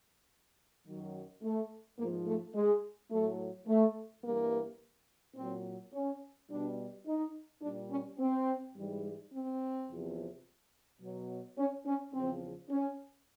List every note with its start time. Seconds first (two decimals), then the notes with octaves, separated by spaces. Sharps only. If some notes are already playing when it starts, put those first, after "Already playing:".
0.85 F#2 D#3 F#3
1.42 A3
1.98 G#2 F3 A#3
2.27 A3
2.54 G#3
3.11 A2 F#3 A3
3.67 A3
4.24 G2 E3 G3 A#3
5.36 A#2 F#3 C4
5.93 C#4
6.51 B2 G3 D4
7.07 D#4
7.62 A#2 G3 D4
7.90 C#4
8.19 C4
8.76 G#2 E3 G3
9.33 C4
9.89 E2 C3 F3
11.01 B2 F#3
11.58 C#4
11.86 C#4
12.14 E2 C#3 F3 C4
12.70 C#4